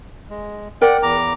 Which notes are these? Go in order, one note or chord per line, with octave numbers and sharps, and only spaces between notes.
G#3
A#4 D5 F#5 G5
E2 A#5 D6